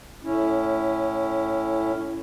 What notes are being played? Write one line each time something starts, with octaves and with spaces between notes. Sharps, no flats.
A2 C#4 E4